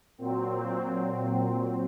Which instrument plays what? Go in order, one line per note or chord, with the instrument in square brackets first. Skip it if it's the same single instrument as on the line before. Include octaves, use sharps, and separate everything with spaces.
[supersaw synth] A#2 F#3 C4